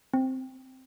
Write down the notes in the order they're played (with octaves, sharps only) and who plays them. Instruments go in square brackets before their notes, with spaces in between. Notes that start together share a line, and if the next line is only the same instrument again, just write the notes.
[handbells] C4